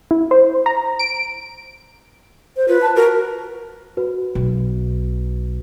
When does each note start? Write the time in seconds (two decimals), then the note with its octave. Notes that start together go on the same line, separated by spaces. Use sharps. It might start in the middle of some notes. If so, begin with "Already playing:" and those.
0.11 E4
0.31 C5
0.66 A#5
0.99 D7
2.57 C5
2.68 F4 B4
2.82 A5
2.96 F#4 A#4
3.97 F#4 B4
4.35 B1